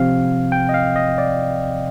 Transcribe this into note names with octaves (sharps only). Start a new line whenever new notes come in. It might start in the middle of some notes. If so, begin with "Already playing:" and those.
Already playing: C3 F3 C4 F5
G5
D#5
F5
D#5
D5